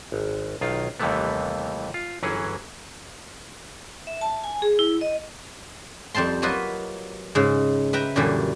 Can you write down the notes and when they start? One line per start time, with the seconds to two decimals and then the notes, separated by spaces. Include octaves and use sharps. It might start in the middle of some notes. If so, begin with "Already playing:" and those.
0.12 G#1
0.61 B1 D#3 F4
1.00 D#2 C3 E3 G3 A3 B3
1.94 F4
2.23 G1 E3 F#3 C#4 G#4
4.07 E5
4.21 A5
4.44 G#5
4.62 G#4
4.79 E4
5.01 D#5
6.15 F2 G3 C4 A5 C6
6.42 F#3 A#3 F4 B4 D#5
7.35 G#2 C#3
7.93 B4 E5 G5 A#5
8.16 F#2 A#2 D3 E3 G3